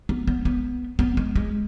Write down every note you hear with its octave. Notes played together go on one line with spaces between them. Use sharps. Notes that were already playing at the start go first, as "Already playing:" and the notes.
B3
B3
B3
B3
G#3
G#3